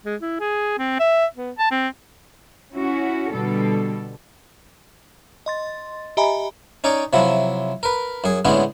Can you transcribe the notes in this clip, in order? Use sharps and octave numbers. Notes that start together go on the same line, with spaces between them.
G#3
E4
G#4
C4
E5
B3
A5
C4
C#4 E4 F#4
B2 D3 G3 A4
D#5 C6 A6
G4 D#5 E5 G#5 A#5 B5
C#4 D#4 C#5 D5
C3 F3 F#3 E4
A#4 B4
F#2 G#4
A2 D3 G#3 B3 C#4